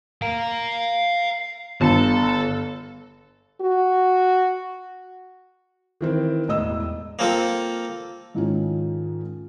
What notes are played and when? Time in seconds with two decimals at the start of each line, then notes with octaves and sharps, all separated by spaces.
0.22 F5 A#5
1.81 G1 B3 A4 A5
3.61 F#4
6.01 D#3 E3 C4
6.48 E1 A2 D#5 E6
7.19 A#3 C4 F4 A4
8.35 G#2 D#3 F3 G#3 C#4